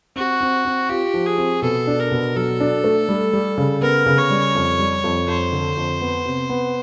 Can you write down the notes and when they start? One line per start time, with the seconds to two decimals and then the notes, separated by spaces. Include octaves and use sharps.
0.16 C4 F#4
0.41 C4
0.65 C4
0.89 F4 G4
1.14 F3
1.26 G#4
1.38 C4
1.62 B2 A4
1.87 D4
2.00 A#4
2.11 B2
2.36 F#3 A4
2.60 D4
2.84 A3
3.09 G3
3.33 G3
3.58 C#3
3.81 B3 A#4
4.06 C#3
4.18 C#5
4.30 G3
4.55 F2
4.79 G3
5.04 F2
5.28 F2 C5
5.52 D3
5.77 F2
6.01 B3
6.26 C3
6.50 B3